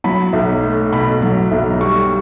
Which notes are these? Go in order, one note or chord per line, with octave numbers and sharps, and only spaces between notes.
F#3 B5
B1
A3
B2 B5
F#3
B1
G3 C#6